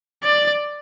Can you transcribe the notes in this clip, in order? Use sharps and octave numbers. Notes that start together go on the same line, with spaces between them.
D5